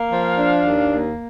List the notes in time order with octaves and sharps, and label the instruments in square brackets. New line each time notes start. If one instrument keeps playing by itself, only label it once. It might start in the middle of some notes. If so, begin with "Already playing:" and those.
Already playing: [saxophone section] A#3 [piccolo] F5
[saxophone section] F3
D4
D#2
A#3